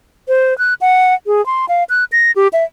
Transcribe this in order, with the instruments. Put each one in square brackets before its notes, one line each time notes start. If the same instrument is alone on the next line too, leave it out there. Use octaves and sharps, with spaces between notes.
[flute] C5
F#6
F#5
G#4
C6
F5
F#6
A#6
G4
E5